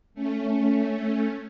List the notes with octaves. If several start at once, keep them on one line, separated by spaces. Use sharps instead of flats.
A3 C#4